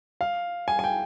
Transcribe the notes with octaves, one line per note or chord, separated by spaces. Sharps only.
F5
G#5
G#5
G5